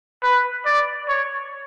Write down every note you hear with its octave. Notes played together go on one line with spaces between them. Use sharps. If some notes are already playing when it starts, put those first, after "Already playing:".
B4
D5
C#5